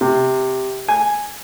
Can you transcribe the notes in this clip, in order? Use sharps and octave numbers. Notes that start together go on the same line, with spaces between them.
C3
G#5